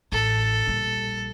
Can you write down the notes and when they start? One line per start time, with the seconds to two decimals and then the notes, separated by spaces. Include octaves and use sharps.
0.12 A1 A4
0.67 A#1 G3